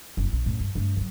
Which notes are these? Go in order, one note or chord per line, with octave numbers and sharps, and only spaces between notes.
F#1 E4
A#1
F#2 A2
G2
G2 A3
D#3 F#3